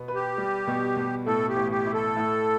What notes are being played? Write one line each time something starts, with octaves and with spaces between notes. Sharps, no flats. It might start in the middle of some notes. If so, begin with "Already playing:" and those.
Already playing: B2 B3
B4
G4
G3
B2
B2
A2 A4
G4
A1
G4
E4
A4
A2